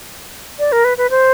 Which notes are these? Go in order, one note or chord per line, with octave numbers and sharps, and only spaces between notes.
D5
A#4
B4
B4
C5